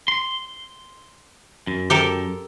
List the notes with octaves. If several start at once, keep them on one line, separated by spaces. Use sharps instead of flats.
C6
F#2
G4 A4 A#4